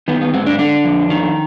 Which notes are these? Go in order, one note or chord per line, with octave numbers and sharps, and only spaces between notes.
D#3 B3
B3
G#2 C4
D4
D3 D4
F2
D#3